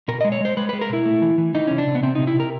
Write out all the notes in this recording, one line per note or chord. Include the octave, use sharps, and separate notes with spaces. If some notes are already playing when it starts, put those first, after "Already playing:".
B2 A#4
D#5
G#3
C#5
G#3 C5
G#3 B4
B4
G#3
A#4
B2 E4
A3
E3
E3
E3 D#4
C3 C#4
D4
C3
B3
C3 C4
D#4
C3
E4
C3 A#4